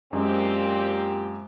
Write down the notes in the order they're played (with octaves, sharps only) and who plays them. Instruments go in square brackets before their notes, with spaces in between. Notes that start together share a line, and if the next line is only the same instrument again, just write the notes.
[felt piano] F#2 G#3 [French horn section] A#2 C4 G4